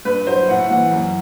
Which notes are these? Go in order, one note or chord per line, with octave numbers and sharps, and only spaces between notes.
G2 B4
F#3 C5
A2 F#5
E3 G3 F#5
F#2